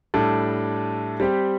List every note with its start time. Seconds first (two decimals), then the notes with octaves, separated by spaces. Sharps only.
0.14 A2 G3 D4 A4
1.20 G3 C4 G4